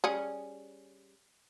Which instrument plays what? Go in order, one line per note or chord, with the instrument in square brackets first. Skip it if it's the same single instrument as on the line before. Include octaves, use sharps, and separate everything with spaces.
[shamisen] G3 C#4 G#4